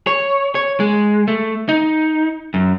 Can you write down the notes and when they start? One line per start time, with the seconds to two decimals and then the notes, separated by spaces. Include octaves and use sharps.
0.07 C#5
0.55 C#5
0.80 G#3
1.28 A3
1.69 D#4
2.54 F#2